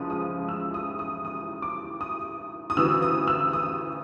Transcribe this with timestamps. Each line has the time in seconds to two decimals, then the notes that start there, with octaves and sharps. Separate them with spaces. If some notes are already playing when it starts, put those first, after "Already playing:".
Already playing: C#2 C#3 F3 G#3 D#6
0.10 D#6
0.49 E6
0.74 D#6
0.99 D#6
1.25 D#6
1.62 D6
2.01 D#6
2.70 D#6
2.77 D2 C#3 E3 G3 E6
3.02 D#6
3.28 E6
3.53 D#6